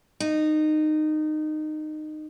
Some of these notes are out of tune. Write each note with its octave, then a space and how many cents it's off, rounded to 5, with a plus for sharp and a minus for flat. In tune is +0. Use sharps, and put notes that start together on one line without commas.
D#4 -20